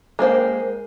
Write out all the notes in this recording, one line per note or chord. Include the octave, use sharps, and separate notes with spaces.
G#3 A#3 C5 G5